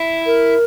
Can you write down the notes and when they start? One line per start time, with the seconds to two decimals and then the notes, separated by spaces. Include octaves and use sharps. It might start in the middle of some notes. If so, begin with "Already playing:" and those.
Already playing: E4
0.26 A#4